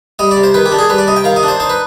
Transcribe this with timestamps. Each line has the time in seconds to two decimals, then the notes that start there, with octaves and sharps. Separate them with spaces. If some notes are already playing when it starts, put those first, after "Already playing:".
0.19 G3 D#5
0.31 D5
0.37 C3
0.43 C5
0.54 D#3 B4
0.66 G4
0.72 D4
0.79 G#4
0.89 G3 B4
0.98 D5
1.07 C3 D#5
1.16 G5
1.24 D#3 F5
1.36 D#5
1.43 D4
1.48 C5
1.60 D#4 C5
1.69 B4